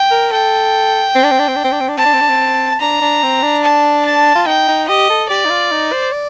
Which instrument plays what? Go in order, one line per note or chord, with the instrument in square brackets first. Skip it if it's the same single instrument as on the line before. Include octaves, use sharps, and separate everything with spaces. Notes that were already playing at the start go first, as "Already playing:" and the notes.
Already playing: [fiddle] G5
[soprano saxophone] A#4
[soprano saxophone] A4 [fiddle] G5
[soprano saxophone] C4
D4
C4
D4
C4
D4
C4
D4
C4
D4
[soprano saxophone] C4 [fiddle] A5
[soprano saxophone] D4
C4
D4
C4
[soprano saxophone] D4 [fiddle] A#5
[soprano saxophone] D4
C4
D4
[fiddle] A5
A5
[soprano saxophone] F4
[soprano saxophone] D#4 [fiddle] G5
[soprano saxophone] D#4
[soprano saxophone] G4 [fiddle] D#5
[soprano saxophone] A4
[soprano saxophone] G4 [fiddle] D5
[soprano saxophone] D#4
F4
D#4
C5
D5